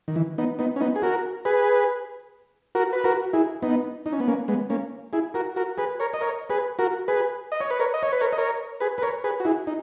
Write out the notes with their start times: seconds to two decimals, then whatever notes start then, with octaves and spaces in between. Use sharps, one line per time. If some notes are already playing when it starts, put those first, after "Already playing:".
0.08 D#3
0.16 E3
0.38 B3 D#4
0.59 B3 D#4
0.76 C#4
0.80 B3 D#4
0.96 G#4
1.02 F#4 A#4
1.45 G#4 B4
2.75 F#4 A#4
2.93 B4
3.04 F#4 A#4
3.33 E4 G#4
3.62 B3 D#4
4.06 D#4
4.13 C#4
4.20 B3
4.28 A#3 C#4
4.48 G#3 B3
4.70 A#3 C#4
5.13 E4 G#4
5.34 F#4 A#4
5.56 F#4 A#4
5.78 G#4 B4
6.00 A#4 C#5
6.14 D#5
6.21 A#4 C#5
6.50 G#4 B4
6.79 F#4 A#4
7.08 G#4 B4
7.52 D#5
7.61 C#5
7.71 B4
7.80 A#4 C#5
7.94 D#5
8.03 C#5
8.13 B4
8.21 A#4 C#5
8.33 D#5
8.38 A#4 C#5
8.80 G#4 B4
8.98 B4
9.02 A#4 C#5
9.24 G#4 B4
9.40 F#4
9.45 E4 G#4
9.67 D#4